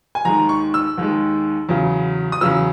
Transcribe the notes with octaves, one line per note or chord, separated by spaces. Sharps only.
G#5
D#2 D#3 G#3 A#5
C#6
E6
D#2 D#3 G#3
E2 C#3 F#3
D#6
E2 C#3 F#3 E6